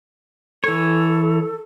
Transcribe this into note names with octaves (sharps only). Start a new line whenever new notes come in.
E3 A4 C#5